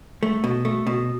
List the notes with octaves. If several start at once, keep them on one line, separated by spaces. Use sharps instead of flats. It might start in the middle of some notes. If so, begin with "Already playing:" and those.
A3
B2
A3
B2